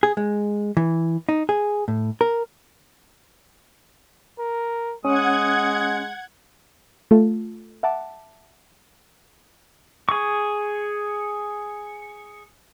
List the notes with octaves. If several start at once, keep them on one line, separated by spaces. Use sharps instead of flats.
G#4
G#3
E3
D#4
G#4
A2
A#4
A#4
G#3 C#4 F#5 D#6 G#6
A3 F4 A4
E5 F#5 A5 D6
G#4 C#6